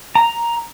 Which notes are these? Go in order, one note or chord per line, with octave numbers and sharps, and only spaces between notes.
A#5